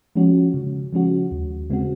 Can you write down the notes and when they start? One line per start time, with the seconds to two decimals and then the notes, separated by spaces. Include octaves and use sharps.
0.15 F3 G#3 C#4 F#4
0.54 C#3
0.93 F3 G#3 C#4 F#4
1.31 D#2
1.70 C#3 G#3 C4 F#4